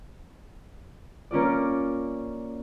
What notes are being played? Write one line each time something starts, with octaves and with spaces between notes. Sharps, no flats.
A#3 C#4 F4 D5